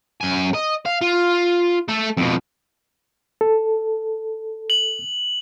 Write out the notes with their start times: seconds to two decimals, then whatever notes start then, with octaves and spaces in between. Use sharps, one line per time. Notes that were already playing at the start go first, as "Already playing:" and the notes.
0.21 F#2 G#5
0.54 D#5
0.86 F5
1.02 F4
1.88 A3 A4
2.17 F2 B2
3.41 A4
4.70 F#7